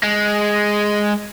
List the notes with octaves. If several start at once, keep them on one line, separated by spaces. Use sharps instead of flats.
G#3